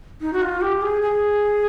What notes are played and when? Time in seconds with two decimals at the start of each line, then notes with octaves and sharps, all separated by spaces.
0.21 D#4
0.33 F#4
0.42 F4
0.61 G4
0.82 G#4
1.02 G#4